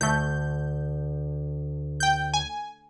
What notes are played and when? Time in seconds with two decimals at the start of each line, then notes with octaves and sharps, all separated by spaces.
0.01 D2 A3 G6
2.00 G5 G6
2.34 G#5